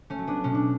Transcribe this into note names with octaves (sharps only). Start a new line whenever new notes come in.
A3 C#4
F#3
B3 D4
B2 C#4
D4